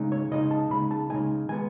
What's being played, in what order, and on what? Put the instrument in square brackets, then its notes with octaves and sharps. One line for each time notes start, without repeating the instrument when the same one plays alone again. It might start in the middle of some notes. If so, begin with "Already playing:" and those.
Already playing: [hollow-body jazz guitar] C#3 G#3 D#4
C#5
C#3 G#3 D#4 D#5
A5
C#3 G#3 D#4 B5
A5
C#3 G#3 D#4 G#5
D#3 G#3 B3 G#5